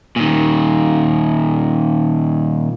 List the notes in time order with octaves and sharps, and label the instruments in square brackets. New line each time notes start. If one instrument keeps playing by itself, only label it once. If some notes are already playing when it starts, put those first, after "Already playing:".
[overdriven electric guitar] A#2 D#3